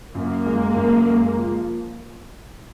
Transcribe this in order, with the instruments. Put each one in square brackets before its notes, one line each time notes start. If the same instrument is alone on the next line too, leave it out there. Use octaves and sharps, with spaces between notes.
[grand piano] F#2 [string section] A#3
[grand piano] G#3
F#2
G#3
F3